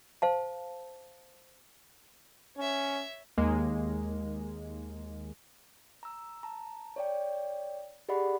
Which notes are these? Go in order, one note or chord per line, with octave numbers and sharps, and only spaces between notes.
C5 F5 A5
C#4 C#5 E5
D#2 G#3 A#3
A#5 E6
A5 A#5
C#5 D5 G5
G4 G#4 D5 D#5 F#5 B5